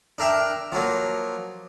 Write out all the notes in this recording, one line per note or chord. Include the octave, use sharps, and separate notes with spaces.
D4 A#4 E5 G5
F3 F#3 A#3